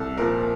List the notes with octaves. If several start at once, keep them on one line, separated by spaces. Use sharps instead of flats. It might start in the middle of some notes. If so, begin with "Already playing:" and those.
Already playing: C2 A4
A#2 F3 A#4